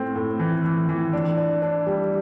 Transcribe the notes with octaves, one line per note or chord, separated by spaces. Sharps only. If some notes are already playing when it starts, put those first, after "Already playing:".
Already playing: A2 C4
A2
E3
E3
E3
D4
D4
D4
G3